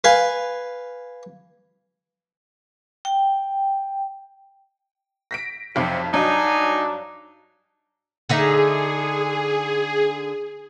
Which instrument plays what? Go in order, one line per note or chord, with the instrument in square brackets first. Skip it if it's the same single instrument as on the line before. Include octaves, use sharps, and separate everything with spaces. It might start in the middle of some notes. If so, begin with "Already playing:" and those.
[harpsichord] B4 F5 G#5
[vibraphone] G5
[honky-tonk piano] A#6 B6 D7
[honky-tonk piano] B1 F2 [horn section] C3
[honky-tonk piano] G2 F#3 [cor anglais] D4 [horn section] D#4 G#5
[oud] D3 D#4 E5 [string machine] G#4